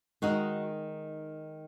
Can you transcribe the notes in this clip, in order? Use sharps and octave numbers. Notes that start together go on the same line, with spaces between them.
D#3 G#3 D#4 F#4